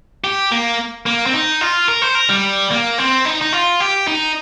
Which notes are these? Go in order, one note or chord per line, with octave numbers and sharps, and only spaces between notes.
G4
A#3
A#3
C4
D#4
F4
A#4
C5
A#4
G3
A#3
C4
D#4
D#4
F4
G4
D#4